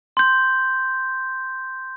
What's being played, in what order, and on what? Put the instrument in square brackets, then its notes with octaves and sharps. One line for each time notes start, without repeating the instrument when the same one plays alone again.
[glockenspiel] C6 G6